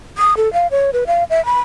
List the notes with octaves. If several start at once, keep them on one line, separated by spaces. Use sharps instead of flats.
D#6
A4
F5
C#5
B4
F5
E5
B5